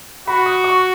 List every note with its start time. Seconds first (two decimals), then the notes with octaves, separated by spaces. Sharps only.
0.27 F#4 B5
0.46 D#6
0.64 C#6